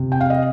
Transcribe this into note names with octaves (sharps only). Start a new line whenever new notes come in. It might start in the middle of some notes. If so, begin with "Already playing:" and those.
Already playing: C3
G5
F5
D#5